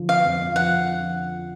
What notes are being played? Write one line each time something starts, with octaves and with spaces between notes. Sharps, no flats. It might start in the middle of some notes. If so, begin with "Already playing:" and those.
Already playing: D3 F3
F5
F2
F3 F#5